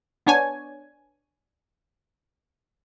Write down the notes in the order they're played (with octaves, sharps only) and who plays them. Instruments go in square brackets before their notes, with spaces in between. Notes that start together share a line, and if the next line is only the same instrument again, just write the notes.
[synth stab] B3 D4 C#5 G#5